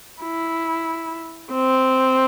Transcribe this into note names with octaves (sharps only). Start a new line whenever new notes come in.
E4
C4